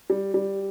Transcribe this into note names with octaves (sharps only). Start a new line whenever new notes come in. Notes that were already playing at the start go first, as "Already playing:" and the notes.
G3
G3